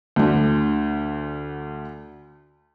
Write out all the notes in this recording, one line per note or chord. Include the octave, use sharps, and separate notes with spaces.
D2 D3